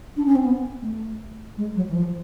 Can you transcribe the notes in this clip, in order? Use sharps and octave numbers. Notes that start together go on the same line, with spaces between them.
D4
C#4
C4
B3
A3
G#3
F#3
E3
F3